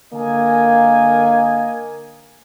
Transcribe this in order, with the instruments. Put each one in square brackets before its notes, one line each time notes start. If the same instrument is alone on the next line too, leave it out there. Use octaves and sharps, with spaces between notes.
[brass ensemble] D3 D#5 G#5 [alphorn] A#3